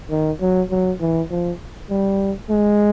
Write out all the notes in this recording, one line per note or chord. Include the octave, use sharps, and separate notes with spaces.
D#3
F#3
F#3
E3
F3
G3
G#3